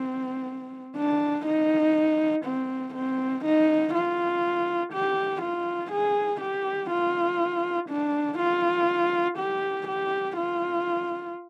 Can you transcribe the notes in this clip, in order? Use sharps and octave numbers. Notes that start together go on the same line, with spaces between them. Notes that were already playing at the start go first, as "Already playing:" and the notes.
Already playing: C4
D4
D#4
C4
C4
D#4
F4
G4
F4
G#4
G4
F4
D4
F4
G4
G4
F4